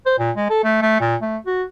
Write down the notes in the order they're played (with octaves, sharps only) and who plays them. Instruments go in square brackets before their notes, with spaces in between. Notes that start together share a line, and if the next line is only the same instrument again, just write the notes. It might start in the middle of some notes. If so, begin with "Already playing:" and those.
[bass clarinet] C5
A#2
G#3
A4
A3
A3
A#2
A3
F#4